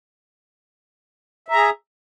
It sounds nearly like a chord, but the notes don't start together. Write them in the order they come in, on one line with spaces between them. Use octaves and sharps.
E5 A#5 G#4